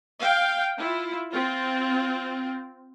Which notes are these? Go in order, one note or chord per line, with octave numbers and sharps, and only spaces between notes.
F5 G5
E4 F4
C4 F4